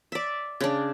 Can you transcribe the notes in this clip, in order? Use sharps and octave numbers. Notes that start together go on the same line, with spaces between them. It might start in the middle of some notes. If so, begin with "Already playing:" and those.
D5 E5
C#3 D4